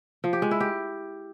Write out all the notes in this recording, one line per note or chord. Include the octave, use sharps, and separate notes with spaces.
F3
G4
G#3
E4
G4